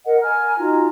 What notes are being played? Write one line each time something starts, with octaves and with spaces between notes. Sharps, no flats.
A#4 D#5 F#5
G#5 A#5 F6
D#4 F4 F#4 A#5